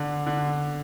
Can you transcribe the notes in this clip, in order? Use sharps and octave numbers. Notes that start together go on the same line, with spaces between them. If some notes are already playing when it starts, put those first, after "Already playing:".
Already playing: D3
D3